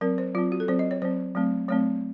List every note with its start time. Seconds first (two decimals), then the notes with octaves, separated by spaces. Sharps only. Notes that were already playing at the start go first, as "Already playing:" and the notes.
0.01 F#3 C4 A#4
0.18 C5
0.35 F#3 C4 F4
0.52 F#4
0.60 A4
0.68 F#3 C4 C5
0.79 D#5
0.91 C#5
1.02 F#3 C4 C5
1.35 F#3 A3 C4
1.69 F#3 A3 C4 C#5